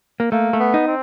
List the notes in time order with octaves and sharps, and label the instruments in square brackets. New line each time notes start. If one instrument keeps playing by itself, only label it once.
[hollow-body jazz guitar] A#3
[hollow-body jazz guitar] A3 [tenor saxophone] A#3
[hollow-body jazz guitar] A3
[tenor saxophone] B3
[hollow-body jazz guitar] D#4
[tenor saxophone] C4